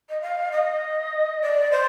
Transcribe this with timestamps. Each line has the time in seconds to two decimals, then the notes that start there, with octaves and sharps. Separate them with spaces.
0.09 D#5
0.21 F5
0.51 D#5
1.41 D5
1.71 C5